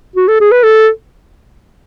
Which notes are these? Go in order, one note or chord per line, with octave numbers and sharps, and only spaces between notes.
F#4
A4
G#4
B4
A4